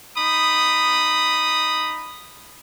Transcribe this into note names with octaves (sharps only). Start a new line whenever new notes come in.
D#4 B5 D#6